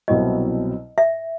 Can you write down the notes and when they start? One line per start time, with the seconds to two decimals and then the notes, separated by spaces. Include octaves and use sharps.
0.08 C2 B2 F#3 C4 E4 D#5
0.98 E5